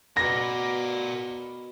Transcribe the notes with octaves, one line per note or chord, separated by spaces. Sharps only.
B2 A#4 D5 B5 A#6